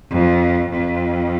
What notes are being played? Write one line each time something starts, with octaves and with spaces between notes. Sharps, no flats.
F2
F2